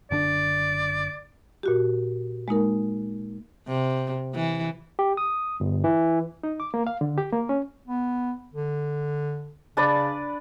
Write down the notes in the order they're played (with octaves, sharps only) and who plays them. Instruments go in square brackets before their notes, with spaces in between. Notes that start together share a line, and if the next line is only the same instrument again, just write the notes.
[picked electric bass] F#1 D3 D4 [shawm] D5
[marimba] A#2 F#4 G4
G#3 A#3 D#4 A#4
[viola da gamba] C3
E3
[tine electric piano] G4
D#6
G1
E3
[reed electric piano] D#4
D6
A#3
F5
D3
G4
A#3
C#4
[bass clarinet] B3
D3
[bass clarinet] C#3 [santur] D4 B4 D5